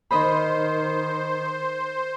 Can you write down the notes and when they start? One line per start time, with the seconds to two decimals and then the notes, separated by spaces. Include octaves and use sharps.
0.11 D#3 C5 D#5 B5